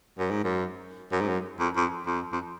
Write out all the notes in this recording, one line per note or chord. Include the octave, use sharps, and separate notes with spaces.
F#2
G#2
F#2
F#2
G#2
F#2
F2
F2
F2
F2